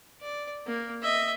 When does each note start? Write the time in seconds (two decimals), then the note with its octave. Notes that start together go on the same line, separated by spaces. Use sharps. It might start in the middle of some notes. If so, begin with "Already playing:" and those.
0.22 D5
0.67 A#3
1.02 D#5 E5